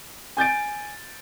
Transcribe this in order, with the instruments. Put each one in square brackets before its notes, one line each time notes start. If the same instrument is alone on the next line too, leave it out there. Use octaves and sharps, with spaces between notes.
[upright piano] G#5 G6 A6 D7